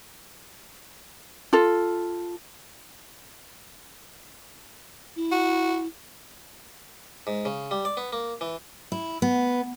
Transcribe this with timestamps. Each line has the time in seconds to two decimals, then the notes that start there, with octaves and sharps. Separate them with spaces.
1.53 F4 A4
5.16 E4
5.32 F#4
7.27 G#2
7.45 C#3
7.71 G3
7.85 D5
7.97 B3
8.13 A#3
8.41 E3
8.92 E4
9.22 B3